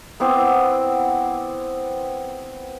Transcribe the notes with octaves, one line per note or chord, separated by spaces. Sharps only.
B3 C4 E4 D6